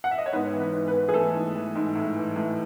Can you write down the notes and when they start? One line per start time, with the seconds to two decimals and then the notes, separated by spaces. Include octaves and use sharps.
0.04 F#5
0.11 E5
0.18 D#5
0.26 C#5
0.33 G#2 B3 B4
0.53 E3
0.60 B3 B4
0.73 G#2
0.87 B3 B4
0.94 E3
1.09 G#4
1.14 E3 A3 A4
1.35 G#2
1.55 E3
1.75 G#2
1.95 A2
2.16 E3
2.36 A2